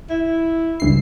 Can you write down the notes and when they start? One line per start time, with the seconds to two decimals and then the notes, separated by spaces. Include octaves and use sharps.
0.10 E4
0.80 C#2 G2 C7